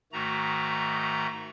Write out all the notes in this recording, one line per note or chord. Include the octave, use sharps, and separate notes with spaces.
G#2 D#3 A3 F#4 A#5